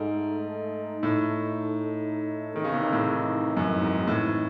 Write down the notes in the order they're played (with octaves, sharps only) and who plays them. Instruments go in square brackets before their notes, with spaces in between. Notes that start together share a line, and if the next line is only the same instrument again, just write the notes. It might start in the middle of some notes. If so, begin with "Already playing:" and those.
Already playing: [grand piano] G#2 [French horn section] A3 D#4 A4
[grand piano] A2
[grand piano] D#3 [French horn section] E3 C4 D#4
[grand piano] C#3
C3
C#3
A2
F#2
G#2
A2